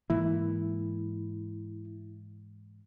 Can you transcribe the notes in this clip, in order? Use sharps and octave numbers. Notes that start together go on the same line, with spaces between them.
G#2 E3 A#3 E4